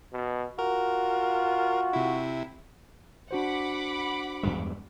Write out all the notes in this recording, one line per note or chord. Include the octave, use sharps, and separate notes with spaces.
B2
F4 F#4 A#4
C3 E4
D4 F#4 C5 F#5 B5 D6
E2 G2 G#3